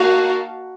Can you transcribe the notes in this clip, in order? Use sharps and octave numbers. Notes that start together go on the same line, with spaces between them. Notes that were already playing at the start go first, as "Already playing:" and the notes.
Already playing: A#3 D#4 F#4 A#4 F5 A5